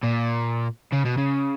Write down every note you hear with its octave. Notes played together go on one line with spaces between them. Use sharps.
A#2
C#3
B2
C#3